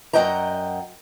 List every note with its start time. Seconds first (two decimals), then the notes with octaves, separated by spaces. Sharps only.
0.13 F#2 E3 D#5 F#5 G5 A#5